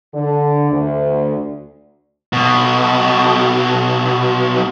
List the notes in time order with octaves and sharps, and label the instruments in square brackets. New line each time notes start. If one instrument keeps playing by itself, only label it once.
[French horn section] D3
D2
[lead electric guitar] B1 B2